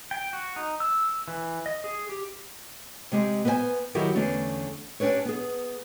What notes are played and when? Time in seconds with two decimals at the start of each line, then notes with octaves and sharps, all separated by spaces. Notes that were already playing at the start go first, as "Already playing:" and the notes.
0.11 G5
0.33 F#4
0.56 D#4
0.80 E6
1.28 E3
1.66 D#5
1.84 G#4
2.09 G4
3.12 C3 G#3 G4
3.45 B3 B4 C5 E5 G#5
3.95 D#3 F#3 E4 F#4 G4 A#4
4.15 E2 D3 A3 C#4
5.00 C#4 D4 G4 B4 C#5
5.25 B3 G#4